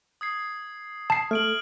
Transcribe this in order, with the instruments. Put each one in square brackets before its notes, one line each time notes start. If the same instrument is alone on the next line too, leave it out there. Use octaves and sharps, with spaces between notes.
[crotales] D#6 G#6 C7
[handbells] A5 C7
[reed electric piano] A3 [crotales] F6 D7 F#7